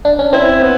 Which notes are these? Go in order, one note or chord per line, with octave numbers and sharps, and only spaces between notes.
D4
C#4
C4 E4
B3